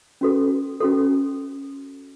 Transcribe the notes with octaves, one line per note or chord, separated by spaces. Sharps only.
C#4 F#4 A4
C#4 F#4 A4